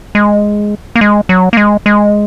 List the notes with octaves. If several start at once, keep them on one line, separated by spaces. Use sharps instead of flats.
G#3
A#3
G#3
F#3
A#3
G#3
G#3